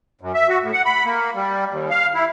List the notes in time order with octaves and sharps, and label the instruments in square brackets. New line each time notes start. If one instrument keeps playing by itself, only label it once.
[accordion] F#2
E5
F#4
A2
F#5
B5
A#3
G3
D#2
F5
E4